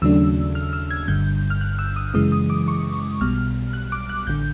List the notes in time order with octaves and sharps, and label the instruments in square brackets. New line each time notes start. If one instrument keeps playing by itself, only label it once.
[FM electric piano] D#2 C#3 F#3 A3 D4 E6
F6
E6
G#6
G1 G2 D3 G6
F6
F#6
E6
D#6
F#2 C#3 E3 G#3 D#6
D#6
D6
C#6
B1 B2 G3 F6
F#6
D6
F#6
A1 D3 G6